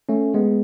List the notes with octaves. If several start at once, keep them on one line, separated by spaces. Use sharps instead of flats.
A3 C#4
G#3 B3